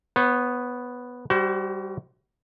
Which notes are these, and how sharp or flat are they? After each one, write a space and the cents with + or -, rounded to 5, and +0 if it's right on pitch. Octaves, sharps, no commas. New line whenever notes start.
B3 +0 C#5 -40
G3 +0 F#4 +35 C5 +0